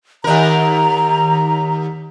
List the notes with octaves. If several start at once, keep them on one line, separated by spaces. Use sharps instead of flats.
D#2 A#4 A#5